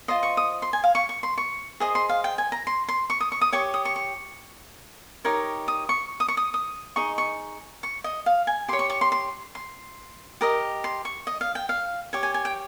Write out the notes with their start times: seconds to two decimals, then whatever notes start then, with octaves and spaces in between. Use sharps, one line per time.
0.08 F4 C5 D#5 C6
0.23 C#6
0.37 D#6
0.62 C6
0.73 G#5
0.84 F5
0.95 C#6
1.09 C#6
1.23 C6
1.38 C#6
1.80 G#4 C5 D#5 D#6
1.95 C6
2.09 F5
2.24 G5
2.38 G#5
2.52 A#5
2.67 C6
2.88 C6
3.10 C#6
3.20 D#6
3.32 C#6
3.41 D#6
3.52 G4 C#5 C#6
3.74 D#6
3.85 C#6
3.96 C#6
5.24 D#4 G4 A#4 C#5
5.68 D#6
5.89 C#6
6.20 D#6
6.28 C#6
6.37 D#6
6.54 D#6
6.96 D#4 G#4 D#5 C#6
7.18 C#6
7.83 C#6
8.04 D#5
8.26 F5
8.47 G#5
8.68 G4 C6
8.73 C#5
8.79 C#6
8.90 C#6
9.01 C6
9.12 C6
9.55 C6
10.41 G4 A#4 D#5
10.84 C6
11.05 C#6
11.27 D#5
11.41 F5
11.55 G5
11.69 F5
12.13 G4 C#5
12.23 G#5
12.34 G#5
12.45 G5